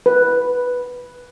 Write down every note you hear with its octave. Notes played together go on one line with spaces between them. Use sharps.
B4